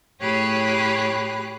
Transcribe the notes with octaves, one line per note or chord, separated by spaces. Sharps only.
A2 G4 G#4 C#5 B5 F#6